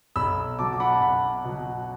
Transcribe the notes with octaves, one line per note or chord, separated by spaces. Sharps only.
B1 B5 E6
B2 F#3 A5 D6
D6
F#5 B5
A5
B1 F#5 B5
B2 F#3